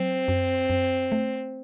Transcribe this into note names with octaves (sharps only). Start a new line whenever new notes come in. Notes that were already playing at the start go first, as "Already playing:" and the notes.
Already playing: F#3 C4
F#2
F#2
A3